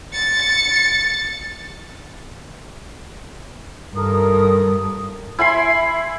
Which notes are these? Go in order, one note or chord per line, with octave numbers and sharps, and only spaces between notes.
A6 C#7
G2 D#3 A4 A#4 D#6
E4 G#5 B5 C6